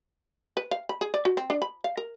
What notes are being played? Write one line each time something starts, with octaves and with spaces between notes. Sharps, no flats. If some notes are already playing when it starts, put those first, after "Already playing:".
B4
F5
B5
G#4
D5
F#4
C4
D4
B5
F5
A#4